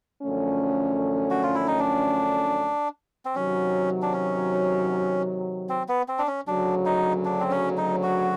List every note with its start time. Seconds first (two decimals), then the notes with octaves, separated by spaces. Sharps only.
0.23 F#2 D3 F3 A3 C#4
1.31 F#4
1.43 F4
1.55 E4
1.68 D#4
1.79 D4
3.25 C4
3.35 C3 D#3 F#3 C#4
4.02 D4
4.13 C#4
5.69 C4
5.89 B3
6.08 C4
6.19 D4
6.27 C#4
6.47 D2 C#3 F#3 D4
6.86 D#4
7.25 D4
7.40 C4
7.51 C#4
7.78 D#4
8.03 F#4